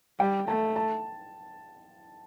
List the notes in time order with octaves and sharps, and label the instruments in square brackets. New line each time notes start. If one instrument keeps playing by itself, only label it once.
[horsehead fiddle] G3 [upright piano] G5
[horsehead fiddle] A3 [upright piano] A5
[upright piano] A5